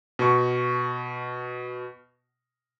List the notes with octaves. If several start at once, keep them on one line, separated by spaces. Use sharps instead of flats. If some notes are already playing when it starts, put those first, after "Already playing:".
B2 C#6